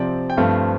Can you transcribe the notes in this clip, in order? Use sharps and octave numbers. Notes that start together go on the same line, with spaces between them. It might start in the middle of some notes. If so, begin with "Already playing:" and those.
Already playing: C3 F3 C4 D5
G5
G2 F3 A3 C4 F5